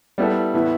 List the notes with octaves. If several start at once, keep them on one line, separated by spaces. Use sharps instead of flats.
G3 B3 E4 A4
A2 E3 B3 E4